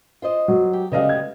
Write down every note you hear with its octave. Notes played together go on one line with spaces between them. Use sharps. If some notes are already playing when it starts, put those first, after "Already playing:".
F4 C5 D#5
F#3
G4
C#3 G3 A3 B3 D#5 F5
G#6